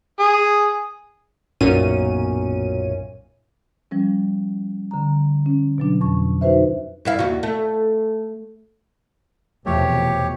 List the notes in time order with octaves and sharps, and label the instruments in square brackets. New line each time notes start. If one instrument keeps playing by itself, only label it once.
[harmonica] G#4
[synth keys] B1 F#2 A#2 C#4 D#7
[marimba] F3 G3 C#4
D3 A#5
C#4
B2 F#3 D4
F2 C#6
D#4 F#4 B4 C5 E5
[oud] G2 E4 F5
D#2 F#4
A3
[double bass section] F1 B2 [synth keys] E2 F3 A3 [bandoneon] G4 C#5